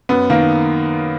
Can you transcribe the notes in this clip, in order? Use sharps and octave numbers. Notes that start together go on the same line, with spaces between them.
F#2 B3
D#3 A#3